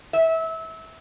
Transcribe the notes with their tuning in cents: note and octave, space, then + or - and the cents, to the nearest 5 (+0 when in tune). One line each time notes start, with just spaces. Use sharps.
E5 -25